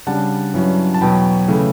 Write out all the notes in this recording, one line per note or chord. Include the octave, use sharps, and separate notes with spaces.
C#3 G3 D4 F#5 A5
G2 F#3 C#4 E4
A5
E2 B2 F#3 G5 B5
C#3 E3 A3